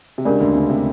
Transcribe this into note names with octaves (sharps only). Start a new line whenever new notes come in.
C3
C#2 C#3 D4 G4 A#4 D5
D2 D3
C#2 C#3
C3